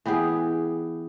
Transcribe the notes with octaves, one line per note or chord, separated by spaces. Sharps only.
E3 B3 G4 G#4